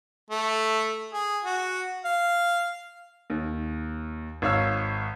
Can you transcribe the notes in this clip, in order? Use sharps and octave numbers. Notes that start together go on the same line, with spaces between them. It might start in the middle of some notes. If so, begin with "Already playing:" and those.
A3
G#4
F#4
F5
D#2
G#1 C#5 F5 E6